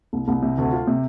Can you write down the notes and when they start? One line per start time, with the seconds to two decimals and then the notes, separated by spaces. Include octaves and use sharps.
0.13 C2
0.28 C2
0.42 C3
0.58 D2
0.72 F4
0.87 C3